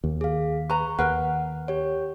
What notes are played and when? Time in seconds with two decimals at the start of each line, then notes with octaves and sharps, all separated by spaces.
0.04 D#2
0.21 G#4 F5
0.70 B4 A#5 C#6
0.99 D#2 A#4 B4 F#5
1.68 G4 C#5